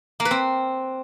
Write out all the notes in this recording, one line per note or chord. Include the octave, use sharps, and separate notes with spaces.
A#3
B4
C4